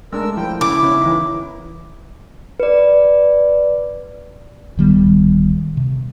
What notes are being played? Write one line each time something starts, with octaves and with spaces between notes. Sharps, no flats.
G#3 A3 D4 A#4 E6
F3 E4 G5
C#3 E4 D6
C#3 B3 C#4
E3 D#4
B4 D5
D1 D#3 G3 B3
C3